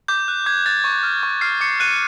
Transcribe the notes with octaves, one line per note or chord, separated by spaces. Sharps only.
D6 G6
F#6
D6 G#6
F#6 A6
C#6
F6
C#6
F6 C7
D6 C#7
F#6 D#7